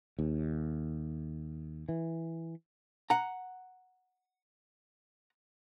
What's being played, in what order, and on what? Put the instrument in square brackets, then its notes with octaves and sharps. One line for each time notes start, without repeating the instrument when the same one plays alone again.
[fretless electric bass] D#2
E3
[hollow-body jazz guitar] F#5 A#5